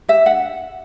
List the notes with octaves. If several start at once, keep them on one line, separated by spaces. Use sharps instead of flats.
G4 E5
D4 F#5